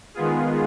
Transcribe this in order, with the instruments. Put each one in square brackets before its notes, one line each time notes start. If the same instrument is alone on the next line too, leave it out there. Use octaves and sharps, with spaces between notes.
[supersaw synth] D#3 G#3 B3 F4 G#4